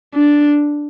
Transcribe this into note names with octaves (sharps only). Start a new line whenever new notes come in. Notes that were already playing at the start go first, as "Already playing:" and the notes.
D4